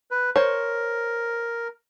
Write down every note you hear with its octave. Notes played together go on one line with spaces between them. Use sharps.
B4
A#4 C5 C#5